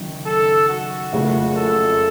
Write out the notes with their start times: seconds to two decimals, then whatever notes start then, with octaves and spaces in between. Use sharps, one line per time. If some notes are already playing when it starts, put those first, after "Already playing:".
Already playing: F#1 F#2 D#3
0.26 A4
0.69 F#4
1.13 F#1 F2 C#3 A3
1.57 A4